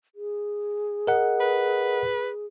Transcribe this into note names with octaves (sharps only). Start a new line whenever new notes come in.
G#4
A#4 D#5 F#5
B4